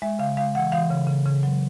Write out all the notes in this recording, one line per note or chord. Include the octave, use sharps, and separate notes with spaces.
G#3 E5
C#3 F5
G#3 F5
E3 F#5
E3 F5
C#3
C#3
C#3
F#3